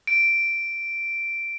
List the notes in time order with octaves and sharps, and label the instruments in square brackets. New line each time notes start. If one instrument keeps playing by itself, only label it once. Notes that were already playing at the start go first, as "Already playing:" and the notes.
[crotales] D7